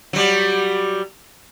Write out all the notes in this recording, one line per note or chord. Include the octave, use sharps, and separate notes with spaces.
F#3 G3